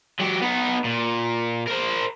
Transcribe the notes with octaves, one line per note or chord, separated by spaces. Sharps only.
F#3 G4
B3 D#4
A#2
A#4 C5